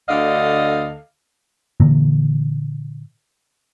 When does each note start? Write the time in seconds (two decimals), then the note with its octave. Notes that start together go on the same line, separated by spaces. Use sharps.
0.09 D2 D3 A4 D#5 F5
1.80 A#2 D3 E3 A#3